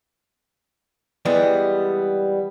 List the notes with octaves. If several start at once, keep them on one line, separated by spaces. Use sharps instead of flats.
E3 G3 G#3 B3